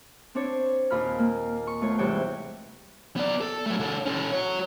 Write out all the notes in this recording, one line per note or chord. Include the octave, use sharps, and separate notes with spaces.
C4 D4 C#5
D#2 A#2 F4 B5 F6
A#3
C#6
A3 B3 F4 C#5
G#2 C3 E3 G3 C#5 G5
B3 D5
A4
F#3 A3
C#3 A4
C#4 A4
F#4 C#5